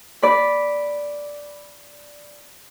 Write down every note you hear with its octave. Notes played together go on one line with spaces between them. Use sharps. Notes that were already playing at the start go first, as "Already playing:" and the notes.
D5 B5